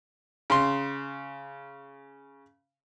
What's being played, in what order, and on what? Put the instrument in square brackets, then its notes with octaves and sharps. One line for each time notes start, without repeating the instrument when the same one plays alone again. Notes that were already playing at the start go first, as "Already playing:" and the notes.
[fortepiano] C#3 C6